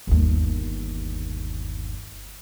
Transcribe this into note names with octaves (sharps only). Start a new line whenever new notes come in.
G1 D#2